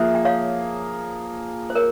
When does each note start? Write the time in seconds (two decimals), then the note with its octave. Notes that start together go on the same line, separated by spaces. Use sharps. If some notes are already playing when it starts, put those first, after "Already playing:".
Already playing: F3 A#3 G#4 C5 E5
0.15 G5
0.25 C#5 F5
1.70 C5
1.75 A#4 C#5